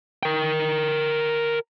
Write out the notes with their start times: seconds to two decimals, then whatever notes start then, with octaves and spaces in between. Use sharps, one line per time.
0.23 A#4 G5